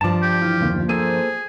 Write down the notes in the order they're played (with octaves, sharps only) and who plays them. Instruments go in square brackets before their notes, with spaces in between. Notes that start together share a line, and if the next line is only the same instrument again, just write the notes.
[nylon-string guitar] G2 F3 [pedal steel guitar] D5 A5
[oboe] G4
[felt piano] E3 [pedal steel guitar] F4
[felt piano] F#1 D#2
[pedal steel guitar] A#3 A4 C5 [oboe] G#4 [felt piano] D#7